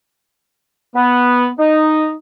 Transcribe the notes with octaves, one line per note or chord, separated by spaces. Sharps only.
B3
D#4